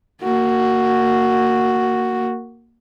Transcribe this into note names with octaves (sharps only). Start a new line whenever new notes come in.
A#3 F#4